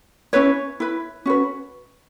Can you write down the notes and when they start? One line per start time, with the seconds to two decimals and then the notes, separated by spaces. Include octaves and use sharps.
0.33 C#4 E4 B4 C#5
0.80 E4 B4
1.26 C#4 F#4 B4